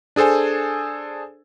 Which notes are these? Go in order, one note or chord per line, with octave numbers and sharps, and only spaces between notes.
D4 G#4 A4 C5 G#5